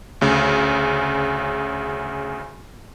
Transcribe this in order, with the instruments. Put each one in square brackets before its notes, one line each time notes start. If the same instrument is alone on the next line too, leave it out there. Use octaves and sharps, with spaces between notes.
[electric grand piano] D2 C#3